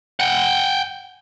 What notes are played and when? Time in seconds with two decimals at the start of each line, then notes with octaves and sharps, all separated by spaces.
0.20 F#5 G5